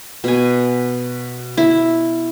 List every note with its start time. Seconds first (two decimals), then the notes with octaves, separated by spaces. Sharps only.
0.24 B2 G#5
1.57 E4